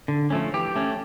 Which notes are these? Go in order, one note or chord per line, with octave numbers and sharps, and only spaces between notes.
D3
F3 A3 C#4
E3 G4
A3 C#4